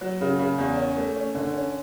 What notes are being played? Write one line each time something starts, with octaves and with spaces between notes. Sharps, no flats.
F#3
C#3
C#3
E2
C#4
A3
C#4
D3
C#4